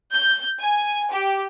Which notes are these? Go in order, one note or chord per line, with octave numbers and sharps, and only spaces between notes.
G6
G#5
G4